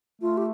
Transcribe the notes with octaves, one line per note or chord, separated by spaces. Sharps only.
A3 F4
G4